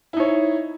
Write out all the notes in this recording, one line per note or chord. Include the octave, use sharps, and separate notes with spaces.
D#4 E4 C#5